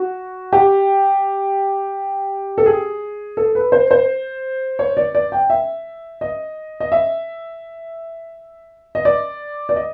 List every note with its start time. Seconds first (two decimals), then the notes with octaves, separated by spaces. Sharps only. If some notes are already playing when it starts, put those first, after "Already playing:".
Already playing: F#4
0.53 G4
2.58 A4
2.66 G#4
3.37 A4
3.55 B4
3.72 C5
3.91 C5
4.79 C#5
4.97 D5
5.15 D5
5.32 G5
5.50 E5
6.21 D#5
6.80 D#5
6.92 E5
8.95 D#5
9.05 D5
9.69 D5
9.76 D#5